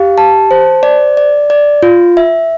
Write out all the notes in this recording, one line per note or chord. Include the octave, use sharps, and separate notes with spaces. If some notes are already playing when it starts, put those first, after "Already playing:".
Already playing: G4 F5
A5
C5
D5
D5
D5
F4
E5